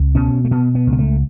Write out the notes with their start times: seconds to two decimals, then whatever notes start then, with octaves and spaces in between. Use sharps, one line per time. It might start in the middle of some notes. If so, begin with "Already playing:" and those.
Already playing: C#2
0.15 B2 C#4
0.45 A3
0.51 B2 B3
0.75 B3
0.87 C#2
0.92 B3
0.99 A3